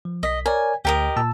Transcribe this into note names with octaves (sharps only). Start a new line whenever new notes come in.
F3
B1 D#5 B6
A#4 C#5 D5 G#5
D2 G4 A#4 D#5
A#2 A5 E6